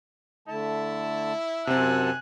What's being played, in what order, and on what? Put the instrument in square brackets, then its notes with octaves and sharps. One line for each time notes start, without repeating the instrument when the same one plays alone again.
[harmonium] D3 A3 A5 [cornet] E4
[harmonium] F#2 F#5 A5 [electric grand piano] C3 C4 [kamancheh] G#5 F#6